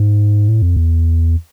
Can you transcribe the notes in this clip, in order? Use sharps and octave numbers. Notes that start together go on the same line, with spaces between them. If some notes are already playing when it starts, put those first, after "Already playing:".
Already playing: G#2
A2
F2
E2